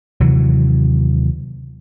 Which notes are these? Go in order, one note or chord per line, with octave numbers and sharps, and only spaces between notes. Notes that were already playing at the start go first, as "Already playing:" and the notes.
D#2 C3 E3 F#3